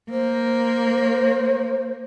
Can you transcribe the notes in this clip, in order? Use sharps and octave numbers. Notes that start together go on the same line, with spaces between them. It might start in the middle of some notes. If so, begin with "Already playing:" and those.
A#3 C5